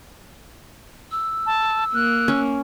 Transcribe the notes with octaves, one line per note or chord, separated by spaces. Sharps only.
E6
A5
A#3 F#6
C#4